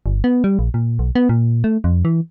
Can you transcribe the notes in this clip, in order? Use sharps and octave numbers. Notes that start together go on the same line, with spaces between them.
G1
B3
G3
A#1
A#2
B1
B3
A#2
A3
F2
E3